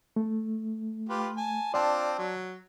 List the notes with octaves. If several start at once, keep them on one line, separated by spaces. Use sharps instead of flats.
A3
F4 G4 B4
G#5 A5
C4 D4 F4 D5 A5
F#3